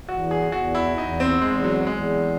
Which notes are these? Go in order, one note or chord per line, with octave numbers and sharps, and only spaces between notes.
E2 F#4
G#4
E2 F#4
E4
E2 D#4
C4
E2 G#3
F#3
E2 G#3